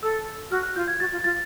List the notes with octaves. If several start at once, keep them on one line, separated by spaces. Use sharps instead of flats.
A4 E6
F#4 F6
F#6
F4 G6
G#6
F#4 A6
F4
F4 A6